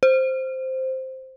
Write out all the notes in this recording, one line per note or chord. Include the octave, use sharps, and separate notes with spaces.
C5